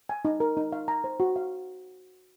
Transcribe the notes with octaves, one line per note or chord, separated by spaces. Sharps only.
G#5
D#4
A#4
D#4
F5
A#5
C5
F#4
F5